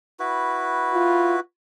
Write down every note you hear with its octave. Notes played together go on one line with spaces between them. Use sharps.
E4 F#4 B4
F4